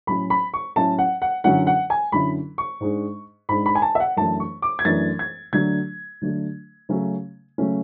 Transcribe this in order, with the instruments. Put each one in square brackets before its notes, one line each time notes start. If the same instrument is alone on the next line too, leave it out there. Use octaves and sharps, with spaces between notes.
[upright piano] A2 F#3 C#4 E4 B5
B5
C#6
A2 F#3 C#4 E4 A5
F#5
F#5
F#2 D3 F#3 C#4 E4 F#5
F#5
G#5
F#2 D3 F#3 C#4 E4 B5
C#6
G#2 G#3 D4
G#2 G#3 D4 B5
B5
G#5
A5
E5
F#5
F#2 E3 A3 D4 A5
C#6
D6
G#6
F#2 E3 A3 D4 A6
G#6
D3 F#3 A3 D4 G#6
D3 F#3 A3 D4
C#3 F#3 A3 C#4
C#3 F#3 A3 C#4